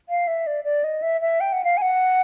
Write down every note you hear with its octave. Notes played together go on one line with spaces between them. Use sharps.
F5
E5
D5
D5
D#5
E5
E5
G5
F#5
F5
G#5
F#5